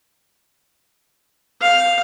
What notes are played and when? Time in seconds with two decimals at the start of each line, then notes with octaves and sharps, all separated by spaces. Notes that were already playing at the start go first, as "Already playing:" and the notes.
1.61 F5